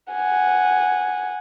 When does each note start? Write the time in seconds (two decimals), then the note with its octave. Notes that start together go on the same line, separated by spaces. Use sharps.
0.13 F#5 G#5